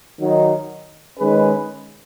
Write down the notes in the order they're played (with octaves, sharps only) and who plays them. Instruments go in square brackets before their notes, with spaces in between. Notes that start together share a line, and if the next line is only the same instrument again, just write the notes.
[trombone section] D#3 F#3 D#4
D#3 G#3 C#4 G#4 B4